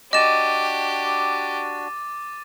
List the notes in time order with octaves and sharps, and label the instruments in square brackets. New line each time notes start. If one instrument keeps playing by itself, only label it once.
[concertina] D4 F#4 [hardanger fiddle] G4 [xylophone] D#5 E7 [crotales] D6 A6 D#7